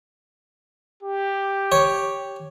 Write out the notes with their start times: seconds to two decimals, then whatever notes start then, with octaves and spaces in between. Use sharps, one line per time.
1.03 G4
1.72 C#5